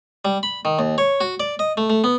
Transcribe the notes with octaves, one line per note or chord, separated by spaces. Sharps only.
G3
B5
D#3
D#2
C#5
F#4
D5
D#5
A3
A3
B3